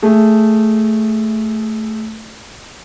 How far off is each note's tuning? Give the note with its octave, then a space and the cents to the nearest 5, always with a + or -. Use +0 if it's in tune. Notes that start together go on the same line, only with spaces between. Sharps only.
A3 +0 G#4 +0